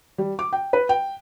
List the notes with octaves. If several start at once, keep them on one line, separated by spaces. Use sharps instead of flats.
G3
D6
G5
B4
G5